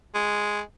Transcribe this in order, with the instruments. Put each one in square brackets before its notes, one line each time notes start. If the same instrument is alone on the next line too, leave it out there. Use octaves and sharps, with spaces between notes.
[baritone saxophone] G#3